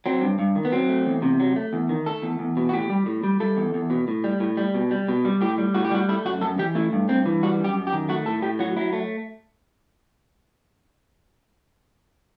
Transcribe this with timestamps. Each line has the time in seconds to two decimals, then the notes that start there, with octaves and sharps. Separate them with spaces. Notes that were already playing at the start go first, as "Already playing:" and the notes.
0.06 F#3 C4
0.22 G2
0.39 G2
0.56 D#3
0.65 B3
0.72 F#3 C4
0.89 A3
1.06 E2
1.22 C3
1.40 F#3
1.56 A3
1.73 E2
1.89 D#3
2.06 A3 A4
2.22 E2
2.39 E2
2.57 B2
2.69 F#4
2.73 A2 G4
2.90 G3
3.06 A2
3.23 G3
3.40 G3 A4
3.57 E2
3.74 E2
3.90 B2
4.08 A2
4.24 G3
4.40 A2
4.57 G3
4.74 B2
4.91 G3
5.08 B2
5.25 G3
5.41 A2 G4
5.58 G3
5.75 A2 F#4
5.85 G4
5.91 G3 F#4
6.08 A3 E4
6.25 F#2 F#4
6.41 F#2 A4
6.58 E3 G4
6.75 A3 E4
6.92 G2
7.09 G2 C4
7.26 E3
7.43 G3 F#4
7.59 F#2 G4
7.76 F#2
7.87 G4
7.93 D#3
8.09 A3 F#4
8.26 A2 A4
8.42 A2 G4
8.59 F#3 F#4
8.77 F#3 E4
8.93 A3